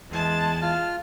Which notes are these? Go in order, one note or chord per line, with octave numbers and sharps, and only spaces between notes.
E2 E3 G#3 A5
F4 F6